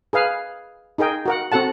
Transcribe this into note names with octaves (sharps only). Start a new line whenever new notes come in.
G#4 B4 F5
D#4 G#4 A#4 G5
F#4 A#4 F#5
C4 F#4 A4 F#5 A5